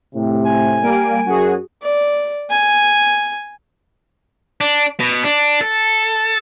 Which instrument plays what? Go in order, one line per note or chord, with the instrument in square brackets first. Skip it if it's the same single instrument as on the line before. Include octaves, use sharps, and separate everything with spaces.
[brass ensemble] A2 C3
[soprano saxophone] G#5
[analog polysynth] G3 A#3 D7
[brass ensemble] F#2 [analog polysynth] F#4 G#4
[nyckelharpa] D5
G#5
[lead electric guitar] D4
B2
D4
A4